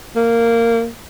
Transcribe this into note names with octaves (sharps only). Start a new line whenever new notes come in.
A#3